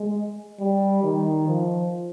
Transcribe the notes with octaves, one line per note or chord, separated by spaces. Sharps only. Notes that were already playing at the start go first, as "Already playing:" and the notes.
Already playing: G#3
G3
D#3
F3